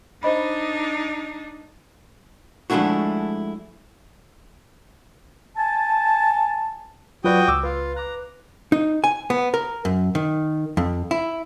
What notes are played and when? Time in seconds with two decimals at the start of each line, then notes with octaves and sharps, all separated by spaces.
0.23 D4 D#4 C5 D#5 B5
2.70 F3 G#3 A3 D4 E4 F#4
5.58 G#5 A5
7.24 F#3 F4 F#4 B4 D5 G5 D#6
7.48 C#2 D6 E6
7.63 F4 B4
7.96 A#5 D6 F#6
8.72 D#4
9.04 G#5
9.30 B3
9.54 A#4
9.85 F#2
10.15 D#3
10.77 F2
11.11 E4